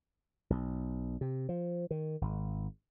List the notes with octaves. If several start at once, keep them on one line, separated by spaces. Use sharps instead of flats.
B1
C3
F3
D#3
G#1